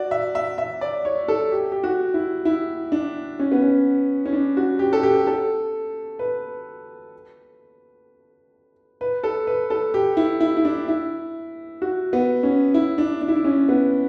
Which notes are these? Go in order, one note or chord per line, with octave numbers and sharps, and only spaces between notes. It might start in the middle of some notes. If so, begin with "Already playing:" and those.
Already playing: F#4 D5
E5
E5
E5
D5
C#5
A4
G4
G4
F#4
E4
E4
D4
C#4
B3
C#4
C#4
D4
F#4
G4
A4
G4
A4
B4
B4
A4
B4
A4
G4
E4
E4
E4
D4
E4
F#4
B3
C#4
E4
D4
D4
E4
D4
C#4
B3